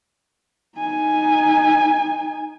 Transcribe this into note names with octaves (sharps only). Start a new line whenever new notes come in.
D#4 G#5